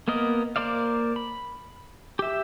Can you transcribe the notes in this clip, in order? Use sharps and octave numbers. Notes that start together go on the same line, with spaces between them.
A#3 B3 A#4 D#5
A#3 A#4 C5 D5 F5
B5
G4 E5